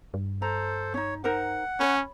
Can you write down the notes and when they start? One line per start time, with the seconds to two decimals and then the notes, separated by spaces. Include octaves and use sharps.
0.14 G2
0.42 A4 C5 A#5
0.94 C#4 D#4 C#5
1.24 D#4 A#4 C5 F#5
1.80 C#4 C#5 B5